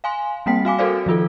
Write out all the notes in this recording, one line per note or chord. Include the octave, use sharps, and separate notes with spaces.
F5 G#5 C6
G3 A#3 C4 G5 B6
F#4 F5 G#5 D6
F#4 A4 A#4 C5 D5 F5
D#3 F3 F4 A4